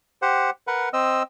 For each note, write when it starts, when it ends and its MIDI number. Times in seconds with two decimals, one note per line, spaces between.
0.22 0.50 67
0.22 0.50 72
0.22 0.50 78
0.67 0.89 70
0.67 0.89 71
0.67 0.89 78
0.93 1.23 60
0.93 1.23 75
0.93 1.23 88